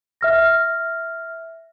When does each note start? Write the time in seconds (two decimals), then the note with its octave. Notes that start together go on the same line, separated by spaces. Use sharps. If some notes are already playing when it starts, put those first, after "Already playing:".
0.21 E5 F6 A#6